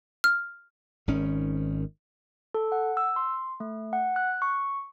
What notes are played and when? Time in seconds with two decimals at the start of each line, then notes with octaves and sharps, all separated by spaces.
0.24 F6
1.08 G#1 D#3 C#4
2.54 A4
2.72 F#5
2.97 E6
3.16 C6
3.60 A3
3.93 F#5
4.16 F#6
4.42 C#6